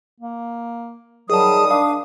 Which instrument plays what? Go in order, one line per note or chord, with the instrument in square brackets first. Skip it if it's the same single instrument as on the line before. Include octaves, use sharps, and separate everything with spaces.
[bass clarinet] A#3
[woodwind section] D#3 G3 D#6 [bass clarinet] F#3 [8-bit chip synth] G#4 A5
[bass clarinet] D4 [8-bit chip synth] F5